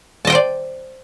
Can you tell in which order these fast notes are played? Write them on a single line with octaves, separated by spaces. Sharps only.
A5 D#5 G5 C5 D5